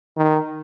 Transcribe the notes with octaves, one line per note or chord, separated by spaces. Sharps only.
D#3